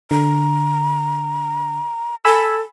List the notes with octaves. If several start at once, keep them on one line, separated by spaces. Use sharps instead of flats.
D3 A#5
A4 G#5 B5 E6